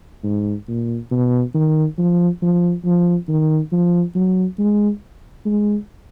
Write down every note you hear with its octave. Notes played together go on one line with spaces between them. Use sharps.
G#2
A#2
B2
D#3
F3
F3
F3
D#3
F3
F#3
G#3
G#3